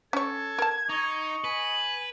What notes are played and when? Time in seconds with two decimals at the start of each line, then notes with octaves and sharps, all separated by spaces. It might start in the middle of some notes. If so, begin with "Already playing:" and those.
0.13 C#4 A4 C#5 G#6
0.59 A#4 A5
0.89 D#4 D#5 C#6
1.44 B4 G#5